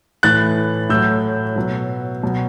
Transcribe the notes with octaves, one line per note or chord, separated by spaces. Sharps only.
A2 E3 F#6 A6
A2 F#3 E6 G6
B2 F#3
B2 F#3